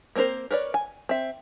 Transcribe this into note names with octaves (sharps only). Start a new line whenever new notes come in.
A#3 C4 D#4 A#4 C5
A#4 B4 C#5 D5
G#5
C4 E5